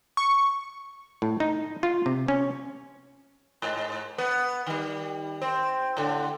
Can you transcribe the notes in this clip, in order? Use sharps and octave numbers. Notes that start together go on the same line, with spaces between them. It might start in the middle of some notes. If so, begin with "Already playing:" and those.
C#6
A2
D#4
F4
C3
C#4
G#2
B3
D#3 G3
C4
A2 D3